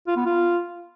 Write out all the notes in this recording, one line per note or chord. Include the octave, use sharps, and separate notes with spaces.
F4
B3
F4